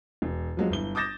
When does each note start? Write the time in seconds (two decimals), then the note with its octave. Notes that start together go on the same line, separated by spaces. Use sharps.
0.22 E1
0.57 F3 F#3 G#3
0.70 G1 E4 G7
0.95 D6 D#6 G6 A6 A#6 E7